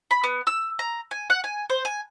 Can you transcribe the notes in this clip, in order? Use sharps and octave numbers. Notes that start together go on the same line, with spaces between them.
B5
B3
E6
A#5
G#5
F#5
G#5
C5
G#5